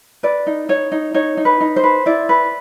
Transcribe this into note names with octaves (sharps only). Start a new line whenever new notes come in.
B4 D5
D#4
D#4 C#5
D#4
D#4 C#5
D#4
B4
D#4
C5
B4
E4 D5
B4